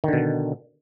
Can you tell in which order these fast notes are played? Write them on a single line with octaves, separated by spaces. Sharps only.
D#3 D3 B2